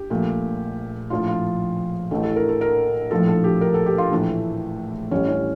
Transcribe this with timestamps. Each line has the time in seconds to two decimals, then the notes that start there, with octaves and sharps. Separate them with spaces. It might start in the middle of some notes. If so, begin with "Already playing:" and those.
Already playing: G4
0.10 A#1 A#2 A3
1.10 A#1 A2 F3 F4
1.28 F4
2.11 A1 A2 E3 A3 A4
2.23 A4
2.36 A#4
2.49 A4
2.61 A#4
3.11 A#1 A2 F3 A4
3.28 A4
3.44 G4
3.61 A#4
3.74 A4
3.86 G4
3.98 F4
4.11 A#1 A2 E3 A3
5.11 A1 A2 G3 C#4
5.29 C#4